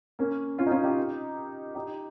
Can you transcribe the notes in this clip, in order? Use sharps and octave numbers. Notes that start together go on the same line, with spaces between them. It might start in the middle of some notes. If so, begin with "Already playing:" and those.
A#3 C#4
C#4 F4
D#4
C#4 F4
D#4 G4
D#4 G4